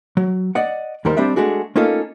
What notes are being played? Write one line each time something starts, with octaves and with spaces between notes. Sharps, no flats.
F#3
D5 D#5 F#5
D#2 D#3 G3 A#4 C5
G3 C4 D4 E5
G#3 A3 D4 F#4 G#4
A3 A#3 C#4 D#4 F4 A4